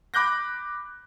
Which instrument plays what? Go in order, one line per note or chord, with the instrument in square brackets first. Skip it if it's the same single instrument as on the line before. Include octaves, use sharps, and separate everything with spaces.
[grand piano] B5 D6 F#6 G6 A#6